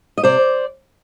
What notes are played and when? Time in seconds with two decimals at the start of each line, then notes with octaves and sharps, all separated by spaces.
0.18 D#5
0.23 C3 C5 D5